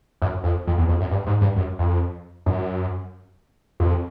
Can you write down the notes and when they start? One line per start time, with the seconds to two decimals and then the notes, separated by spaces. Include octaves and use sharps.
0.22 F#2
0.44 F2
0.67 F2
0.78 E2
0.88 F2
1.00 F#2
1.11 G2
1.27 G#2
1.41 G2
1.56 F#2
1.79 F2
2.46 F#2
3.80 F2